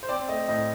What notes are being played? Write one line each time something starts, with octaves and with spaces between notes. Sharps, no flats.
C5
C4 D5
A3 D#5
A2 D#5